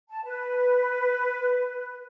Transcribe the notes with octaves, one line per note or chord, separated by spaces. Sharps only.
A5
B4